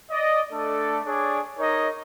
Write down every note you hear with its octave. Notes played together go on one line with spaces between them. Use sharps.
D5 D#5
A3 D4 A4 D5
D4 G#4 C#5 D5
D#4 A#4 C#5 D#5